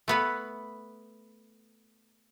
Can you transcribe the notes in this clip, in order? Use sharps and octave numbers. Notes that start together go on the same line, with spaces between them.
A3 B3 B4